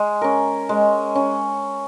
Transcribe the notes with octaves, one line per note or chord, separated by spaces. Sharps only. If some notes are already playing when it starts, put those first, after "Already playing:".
Already playing: G#3
C#4 A#4
G#3
C#4